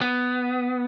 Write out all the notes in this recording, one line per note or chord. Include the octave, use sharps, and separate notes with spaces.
B3